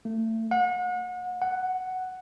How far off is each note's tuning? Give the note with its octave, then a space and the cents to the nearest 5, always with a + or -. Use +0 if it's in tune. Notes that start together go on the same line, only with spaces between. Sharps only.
A3 +30
F#5 -35
F#5 +5